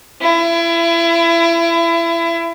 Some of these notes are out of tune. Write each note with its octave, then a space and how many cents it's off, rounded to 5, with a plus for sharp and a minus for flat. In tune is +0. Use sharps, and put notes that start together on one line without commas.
E4 +30